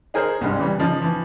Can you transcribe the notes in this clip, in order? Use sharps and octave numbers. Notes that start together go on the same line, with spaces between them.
D#4 G#4 A#4 C5
C2 G2 G#3
C#3 E3 G3
C#3 F3 D#4
E3 F3